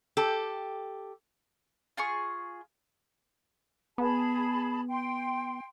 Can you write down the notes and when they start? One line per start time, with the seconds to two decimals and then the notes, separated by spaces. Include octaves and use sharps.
0.17 G4 A4
1.97 F4 G#4 C6 C#6
3.98 B3 G#4 A5 B5
4.88 G5 C6